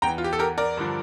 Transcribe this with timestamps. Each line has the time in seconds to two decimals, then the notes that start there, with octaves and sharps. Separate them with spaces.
0.02 E2 G5 A#5
0.07 E3
0.18 F4
0.24 G4
0.33 A4
0.39 G4 A#4
0.58 A#4 D5
0.77 G2 D3 F3